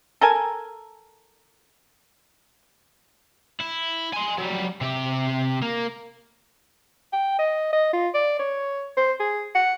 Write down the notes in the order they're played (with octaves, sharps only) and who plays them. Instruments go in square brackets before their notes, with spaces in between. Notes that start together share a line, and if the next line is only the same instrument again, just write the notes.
[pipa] A4 A#4 G#5
[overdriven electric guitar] E4
G#5 C6
F#3 G3
C3 G4
A#3
[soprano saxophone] G5
D#5
D#5
F4
D5
C#5
C5
G#4
F#5